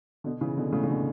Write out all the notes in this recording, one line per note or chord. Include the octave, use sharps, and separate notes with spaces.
B2 D3
C#3 E3
B2 D3
A2 C#3
C#3
B2 D3